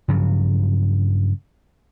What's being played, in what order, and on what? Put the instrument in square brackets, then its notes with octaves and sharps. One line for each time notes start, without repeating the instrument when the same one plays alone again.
[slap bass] G2 C#3 F3 F#3